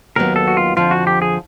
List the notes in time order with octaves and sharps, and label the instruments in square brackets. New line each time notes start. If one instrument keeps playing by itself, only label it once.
[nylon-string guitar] D#2 D#3 F#3 B3 [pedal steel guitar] A#4
[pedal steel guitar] A4
F#4
F4
[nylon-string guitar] F2 D3 F3 [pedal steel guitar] F4
[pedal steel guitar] F#4
G4
G#4